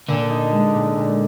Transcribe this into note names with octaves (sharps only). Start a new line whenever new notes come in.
A#2 D3
D#4
G#3
A#2
A#2